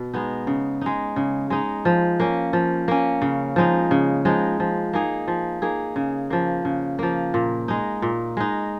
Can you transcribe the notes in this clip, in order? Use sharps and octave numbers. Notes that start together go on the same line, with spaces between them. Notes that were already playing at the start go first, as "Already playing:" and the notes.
Already playing: B2
G#3 B3 D#4
C#3
G#3 D#4
C#3
G#3 D#4
F3
A#3 C#4
F3
A#3 C#4
C#3
F3 G#3 D#4
C#3
F3 G#3 D#4
F3
A#3 D#4 G#4
F3
A#3 D#4 G#4
C#3
F3 A#3
C#3
F3 A#3
A#2
G#3 D#4
A#2
G#3 D#4